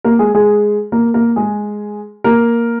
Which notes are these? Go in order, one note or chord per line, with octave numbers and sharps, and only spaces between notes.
A#3 A#4
G#3 G#4
G#3 G#4
A#3 A#4
A#3 A#4
G#3 G#4
A#3 A#4